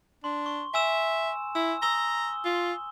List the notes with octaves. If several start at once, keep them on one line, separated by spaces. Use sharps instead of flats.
D4 C6
C#6
E5 G#5 E6 E7
E4 E6
A#5 D#6 E6 G7
F4